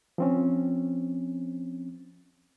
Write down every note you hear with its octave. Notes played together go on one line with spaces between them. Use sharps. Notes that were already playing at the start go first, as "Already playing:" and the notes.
F3 C4 C#4